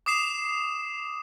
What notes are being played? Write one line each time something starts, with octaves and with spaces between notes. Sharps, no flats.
D6 D#6 C7 E7